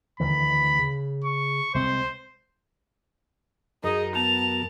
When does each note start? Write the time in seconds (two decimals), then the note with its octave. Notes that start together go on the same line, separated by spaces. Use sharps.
0.20 D2 D#3 E3 B5
0.79 C#3
1.24 C#6
1.74 C2 G#3 C4 C5
3.84 F#2 D#4 G#4 A#4 D#5
4.15 B3 A5 F7